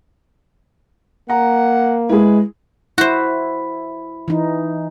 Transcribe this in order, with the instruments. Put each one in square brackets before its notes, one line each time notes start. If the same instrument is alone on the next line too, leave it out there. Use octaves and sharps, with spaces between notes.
[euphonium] A#3 [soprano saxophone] F#5 [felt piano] A#5
[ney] G#3 [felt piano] E4 G#4 [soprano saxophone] B4
[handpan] E4 [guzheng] F#4 C5
[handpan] E3 D#4